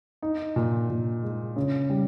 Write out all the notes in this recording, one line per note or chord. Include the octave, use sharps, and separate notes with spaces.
D#4
A#2
A#2
G#3
C#3
G3